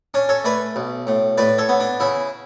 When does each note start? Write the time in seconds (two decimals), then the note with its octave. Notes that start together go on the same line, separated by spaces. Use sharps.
0.14 C#4 D4
0.29 A4 C#5
0.44 A3 B4 D5
0.76 B1
1.07 A2
1.38 A2 B4 D5
1.58 A4 C#5
1.69 B3
1.80 D4
2.00 C#3 E4